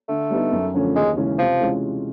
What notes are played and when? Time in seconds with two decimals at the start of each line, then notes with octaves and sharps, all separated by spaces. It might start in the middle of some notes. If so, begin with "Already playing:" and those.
0.09 D3 A3
0.30 G3 B3 D#4
0.52 F#2
0.74 D3 F3 A3 C#4
0.96 D#2 G#3
1.17 C#3 E3 G#3 C#4
1.38 C3 F3
1.60 E3 G#3 C#4 F4